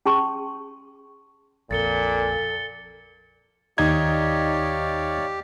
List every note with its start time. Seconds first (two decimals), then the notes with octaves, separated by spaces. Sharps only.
0.06 C#4 G#4 A5 C6 C#6
1.71 A#1 F2 A#2 A4 A6 C#7 G7
3.78 D#2 D#4 G4 C#5 D5 F5 G#6